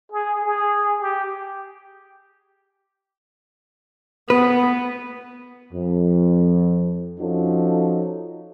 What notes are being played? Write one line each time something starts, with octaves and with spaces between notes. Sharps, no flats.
G#4
G#4
G4
B3 B4
F2
F3 C#4 D#4 F#4 A4